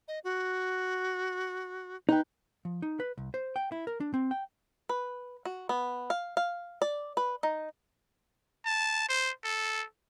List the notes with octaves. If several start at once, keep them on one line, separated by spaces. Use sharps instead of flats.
D#5
F#4
D#4 B4 G5
F3
D#4
B4
C2
C5
G5
E4
A#4
D4
C4
G5
B4
F#4
B3
F5
F5
D5
B4
D#4
A5
C5
A4